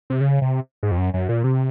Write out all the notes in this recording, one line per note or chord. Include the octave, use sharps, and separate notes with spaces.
C3
C#3
C3
G#2
F2
F#2
F#2
A#2
C3